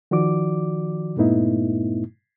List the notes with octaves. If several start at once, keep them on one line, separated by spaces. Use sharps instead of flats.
D#3 F3 F#4 D5 D6
G2 A#2 A3 B3 D#4 E4